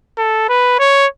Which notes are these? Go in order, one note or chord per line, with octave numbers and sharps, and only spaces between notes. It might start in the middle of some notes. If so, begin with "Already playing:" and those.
A4
B4
C#5